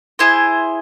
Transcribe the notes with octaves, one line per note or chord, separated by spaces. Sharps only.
E4 G#4 C5